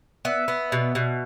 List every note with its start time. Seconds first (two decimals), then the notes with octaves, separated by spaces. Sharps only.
0.25 B3 E5
0.48 B3
0.72 B2
0.95 B2